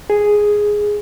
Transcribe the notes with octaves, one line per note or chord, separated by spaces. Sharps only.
G#4